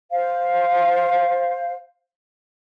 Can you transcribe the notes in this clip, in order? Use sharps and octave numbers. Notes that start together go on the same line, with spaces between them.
C5 F5